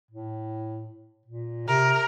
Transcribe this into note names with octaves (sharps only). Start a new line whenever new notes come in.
A2
A#2
C3 A#4